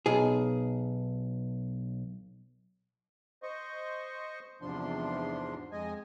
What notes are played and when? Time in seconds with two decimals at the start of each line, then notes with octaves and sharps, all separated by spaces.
0.06 B1 G#4
3.43 C5 D#5 C#6
4.62 E2 G#2 C3 F3 D4 C6
5.72 F2 G#3 D#5 G#5